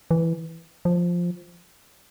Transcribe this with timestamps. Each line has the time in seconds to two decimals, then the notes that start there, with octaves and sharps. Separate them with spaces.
0.11 E3
0.85 F3